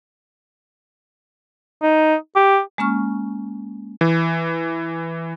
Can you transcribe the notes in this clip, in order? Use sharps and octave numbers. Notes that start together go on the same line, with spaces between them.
D#4
G4
G#3 A#3 C#4 C#6 F6
E3